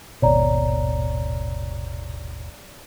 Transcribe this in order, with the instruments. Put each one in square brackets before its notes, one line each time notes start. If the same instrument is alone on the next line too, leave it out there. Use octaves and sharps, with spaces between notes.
[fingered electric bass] D#1 G#1 B2 [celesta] C#5 D5 A#5